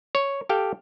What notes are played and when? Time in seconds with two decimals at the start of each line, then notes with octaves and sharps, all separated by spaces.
0.15 C#5
0.49 G4 A4 F5 G5